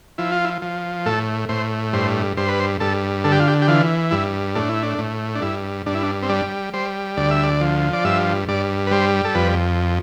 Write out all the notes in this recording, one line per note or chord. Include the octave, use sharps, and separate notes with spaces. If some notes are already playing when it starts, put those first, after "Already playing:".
F3 E4
F4
E4
F3
A2 A4
A2 C5
G2 C5
G2 C5
B4
C5
G2 A4
D3 A4
G4
F4
G4
G4
E3 F4
G2 E4
A2 D4
E4
D4
A2
D4
G2 E4
G2 D4
E4
D4
C4
G3 D4
G3 C5
D2 D5
E5
D5
F3
D5
G2 E5
G2 D5
B4
G3 C5
A4
F2 B4